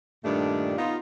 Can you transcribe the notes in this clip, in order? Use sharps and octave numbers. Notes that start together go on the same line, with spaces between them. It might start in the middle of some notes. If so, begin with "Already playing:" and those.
G2 A#2 D#3 A3 D4
B3 D#4 F4